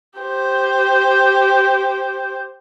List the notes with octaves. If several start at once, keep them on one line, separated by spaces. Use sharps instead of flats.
G4 C5